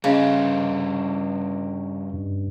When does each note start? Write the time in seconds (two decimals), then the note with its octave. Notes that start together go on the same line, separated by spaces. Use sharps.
0.04 G2 C#3 C#4 D#5
2.13 G2